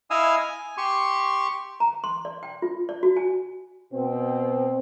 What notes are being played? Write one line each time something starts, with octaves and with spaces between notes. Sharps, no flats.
E4 D#5 F5 G#5 D#6 E6
G#5
G4 C6 C#6
A#5
C6
D5
G5
F4
D5
F#4
G#5
B2 C4